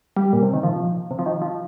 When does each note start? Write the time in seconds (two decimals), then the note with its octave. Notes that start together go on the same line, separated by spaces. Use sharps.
0.17 G3
0.33 A#2
0.43 C3
0.54 D#3
0.63 F3
1.11 C3
1.19 F3
1.26 D#3
1.42 F3